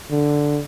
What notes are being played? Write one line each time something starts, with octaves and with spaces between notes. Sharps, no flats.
D3